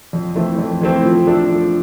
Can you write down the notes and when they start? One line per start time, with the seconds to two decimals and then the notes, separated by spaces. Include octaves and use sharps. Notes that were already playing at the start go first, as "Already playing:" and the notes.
0.13 F2
0.35 E3 A3 C4
0.58 F2
0.81 E3 A3 C4
1.04 F3
1.27 A3 D4 A4
1.49 F3